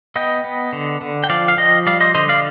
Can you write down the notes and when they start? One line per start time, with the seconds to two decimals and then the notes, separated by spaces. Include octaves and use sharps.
0.16 B3 D#5 G5
0.44 B3
0.73 D3
1.01 D3
1.24 G5
1.29 F3 D5 F5
1.48 F5
1.58 F3 D#5 G5
1.87 G3 D5 F5
2.00 C5 D#5
2.15 D3 C5 D#5
2.29 D5 F5